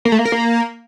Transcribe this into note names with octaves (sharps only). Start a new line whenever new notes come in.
A#3
A3
A#3
A#4
A#3